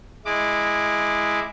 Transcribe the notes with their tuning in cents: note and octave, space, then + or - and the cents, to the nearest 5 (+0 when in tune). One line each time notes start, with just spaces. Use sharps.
G#3 +0 E4 +0 D6 +15